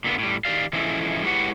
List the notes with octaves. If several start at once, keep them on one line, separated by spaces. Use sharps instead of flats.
A#2 D3 B3 F4
A2 G3
D#3 G4 D5 F5
E3 F3 G#3 C#4 E4 A4
G#3 E4 G4 B4 C#5 F#5